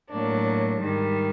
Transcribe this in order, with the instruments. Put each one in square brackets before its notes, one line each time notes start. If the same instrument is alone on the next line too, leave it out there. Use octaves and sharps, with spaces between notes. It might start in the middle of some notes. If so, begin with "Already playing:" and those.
[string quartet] A2 F#3 A#3 D4
G#2 D#3 G3